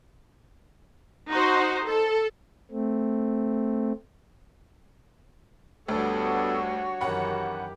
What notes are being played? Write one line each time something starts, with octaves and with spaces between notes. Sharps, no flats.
D#4 F#4 C5
A4
A3 C4
D2 G3 B3 D4 F#4 A4 C#5
F#2 D#3 E3 C#4 G4 F#5 B5